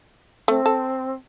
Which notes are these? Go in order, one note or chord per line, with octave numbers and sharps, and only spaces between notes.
A3 C4
A4